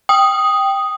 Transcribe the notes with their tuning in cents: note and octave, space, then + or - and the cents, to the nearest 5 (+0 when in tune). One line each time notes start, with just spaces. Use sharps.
G5 +0 D#6 +0